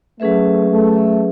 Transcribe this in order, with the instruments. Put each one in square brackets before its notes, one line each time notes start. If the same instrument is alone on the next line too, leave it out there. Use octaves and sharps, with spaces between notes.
[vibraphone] F#3 C#4 G#4 B4 E5 [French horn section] A3
[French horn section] A3